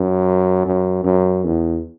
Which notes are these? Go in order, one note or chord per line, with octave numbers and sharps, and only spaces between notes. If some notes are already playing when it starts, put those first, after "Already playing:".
Already playing: F#2
F#2
F#2
E2